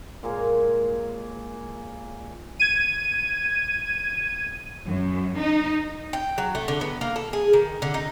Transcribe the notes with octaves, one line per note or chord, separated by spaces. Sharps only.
A#2 G#3 A#3 C#5
G#6 D#7
F#2
D#4
G5
F#3
A3
D3
B3
A#3
A4
G#4
D#3
D3
D#4